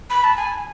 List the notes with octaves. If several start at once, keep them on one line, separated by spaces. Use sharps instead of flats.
B5
A5
G#5